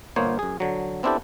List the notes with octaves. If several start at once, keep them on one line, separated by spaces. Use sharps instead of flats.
G1 A#2 A#3 B3 C5 C#5
F#2 G#4
D3 F#3
B3 C4 D4 E4 G4 A4